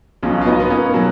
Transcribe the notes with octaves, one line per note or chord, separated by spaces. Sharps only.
B1 B2 F#3 C#4 F4
F4
B3 D#4
B3
A#3 C#4
B2 F#3